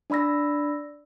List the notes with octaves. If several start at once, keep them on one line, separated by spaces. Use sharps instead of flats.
D4 D5 B5 E6 A#6